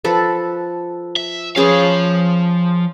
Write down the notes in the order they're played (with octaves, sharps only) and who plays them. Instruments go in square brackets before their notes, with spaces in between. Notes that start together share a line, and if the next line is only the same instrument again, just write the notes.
[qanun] F3 A4 B4
[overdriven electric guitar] E5
[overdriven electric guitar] F3 F5 [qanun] C#4 G#4 B4